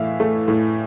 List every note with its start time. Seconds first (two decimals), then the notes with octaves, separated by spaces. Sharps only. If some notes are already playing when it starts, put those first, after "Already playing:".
Already playing: A2 E3 E5 F5
0.20 A3
0.48 A2